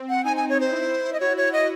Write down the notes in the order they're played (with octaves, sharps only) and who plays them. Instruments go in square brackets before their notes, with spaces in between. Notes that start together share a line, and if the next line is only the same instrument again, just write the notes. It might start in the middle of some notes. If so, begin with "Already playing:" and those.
Already playing: [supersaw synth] C4
[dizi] F#5
[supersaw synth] D#4 [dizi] G#5
[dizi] G#5
C#5
C5
[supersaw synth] E4
[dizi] D#5
[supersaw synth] F#4 [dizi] C#5
[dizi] C#5
D#5